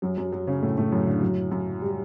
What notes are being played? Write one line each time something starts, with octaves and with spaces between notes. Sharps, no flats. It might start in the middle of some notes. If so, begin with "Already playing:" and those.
F#2 F#3
F#2 F#3
F#2 F#3
C#3 C#4
A2 A3
A2 A3
F#2 F#3
D3
F#2 F#3
F#2 F#3
G3